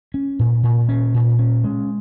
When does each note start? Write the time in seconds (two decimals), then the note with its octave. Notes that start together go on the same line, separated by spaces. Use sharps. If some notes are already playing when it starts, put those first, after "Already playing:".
0.14 C#4
0.39 A#2
0.63 A#2
0.89 C#4
1.14 A#2
1.39 C#4
1.64 G#3